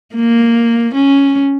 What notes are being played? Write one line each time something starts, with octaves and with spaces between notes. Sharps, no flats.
A#3
C#4